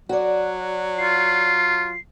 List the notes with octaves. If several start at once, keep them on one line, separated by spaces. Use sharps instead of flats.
F#3 F#4 D5
F4 C7